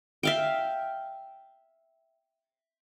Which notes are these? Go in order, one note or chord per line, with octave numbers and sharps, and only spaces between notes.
E5 F5 G5